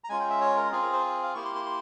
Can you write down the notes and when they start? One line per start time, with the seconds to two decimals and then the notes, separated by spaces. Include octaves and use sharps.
0.04 A#5
0.09 G#3 C#4 F4 G#5
0.20 G5
0.30 E5
0.41 C#5
0.56 A#4
0.72 C4 F4 G#4
0.82 A#4
0.93 C5
1.23 F5
1.35 A#3 E4 G4 C#6
1.45 C6
1.55 C6
1.66 C6